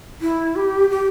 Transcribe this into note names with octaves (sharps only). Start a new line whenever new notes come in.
E4
G4
G4